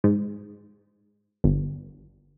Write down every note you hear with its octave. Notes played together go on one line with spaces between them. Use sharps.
G#2
G1